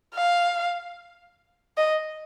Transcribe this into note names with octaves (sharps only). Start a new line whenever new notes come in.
F5
D#5